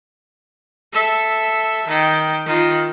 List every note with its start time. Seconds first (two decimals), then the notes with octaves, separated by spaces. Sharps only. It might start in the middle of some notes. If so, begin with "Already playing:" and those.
0.93 A4 E5
1.87 D#3 G5
2.46 D#3 F4